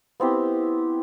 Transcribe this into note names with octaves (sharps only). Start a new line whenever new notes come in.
B3 C4 E4 G4